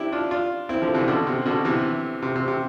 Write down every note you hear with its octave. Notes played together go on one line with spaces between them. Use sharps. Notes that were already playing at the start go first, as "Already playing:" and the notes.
Already playing: C4 D4 E4 G4
D4 F4
D4 F4
C4 E4
D3 F3
C3 E3
B2 D3
C3
B2 D3
C3 E3
C3
C3
C3